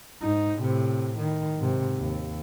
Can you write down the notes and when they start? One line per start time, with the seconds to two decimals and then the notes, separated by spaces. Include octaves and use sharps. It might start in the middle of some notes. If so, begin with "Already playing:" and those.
0.22 G#2 D#4
0.58 A2 C3
1.18 D#3
1.58 G#2 C3
1.99 D#2